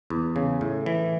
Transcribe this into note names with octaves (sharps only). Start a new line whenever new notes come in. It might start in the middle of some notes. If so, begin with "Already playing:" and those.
E2
C#3
A2
E3